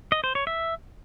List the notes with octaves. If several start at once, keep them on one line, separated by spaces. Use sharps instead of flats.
D#5
C5
C#5
E5